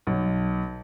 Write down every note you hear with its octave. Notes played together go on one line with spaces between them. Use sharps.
B1